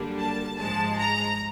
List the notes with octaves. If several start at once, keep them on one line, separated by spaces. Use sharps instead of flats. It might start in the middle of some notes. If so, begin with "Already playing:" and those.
Already playing: F#2 D3 G3 A#3 D4
A5
G#2 F3 G#3 A5
A#5